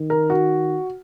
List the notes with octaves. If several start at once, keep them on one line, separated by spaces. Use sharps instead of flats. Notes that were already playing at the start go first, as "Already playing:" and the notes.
Already playing: D#3
A#4
F#4